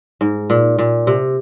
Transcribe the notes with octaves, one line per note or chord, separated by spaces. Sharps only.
G#2
A#2
A#2
C3